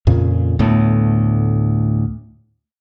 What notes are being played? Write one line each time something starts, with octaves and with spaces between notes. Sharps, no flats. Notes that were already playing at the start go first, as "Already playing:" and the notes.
F2 A#2 C#3
D2 A2 A3 B3